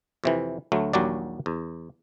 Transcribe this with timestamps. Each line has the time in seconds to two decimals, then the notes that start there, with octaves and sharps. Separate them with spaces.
0.24 F2 C3 E3
0.72 D2 F#3 A3
0.93 A#1 D#2 F#3 G3 F#4 D5
1.46 E2